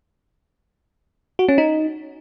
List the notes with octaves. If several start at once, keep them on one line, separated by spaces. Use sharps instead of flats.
F#4
C#4
D#4